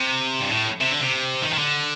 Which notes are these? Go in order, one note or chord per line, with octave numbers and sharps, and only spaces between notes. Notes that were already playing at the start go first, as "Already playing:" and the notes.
Already playing: C3
G2
A2
C3
D3
C3
D#3
D#3
D3